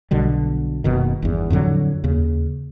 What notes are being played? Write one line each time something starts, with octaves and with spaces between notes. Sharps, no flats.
B1 B2 D3 G3
F#1 B2 D#3
G1 E2
F2 A2 D3 F#3
D#2 C#3